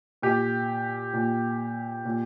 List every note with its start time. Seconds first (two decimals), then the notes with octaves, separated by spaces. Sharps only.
0.22 A#2 G4
1.14 A#2
2.05 A#2